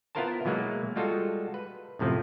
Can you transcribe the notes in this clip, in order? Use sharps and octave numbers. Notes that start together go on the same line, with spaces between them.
B3 E4 F4 A#4 C5 A5
B2 E3 F#3 G#3 A#3
G3 G#3 F4 F#4 A4
B4
F#2 A2 C3 F3